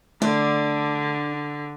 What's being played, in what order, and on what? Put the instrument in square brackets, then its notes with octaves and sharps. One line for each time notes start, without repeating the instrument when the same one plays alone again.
[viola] D3 [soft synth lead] A3 [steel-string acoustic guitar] D4